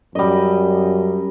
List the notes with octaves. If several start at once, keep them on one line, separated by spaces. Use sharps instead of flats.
F#2 G3 D#5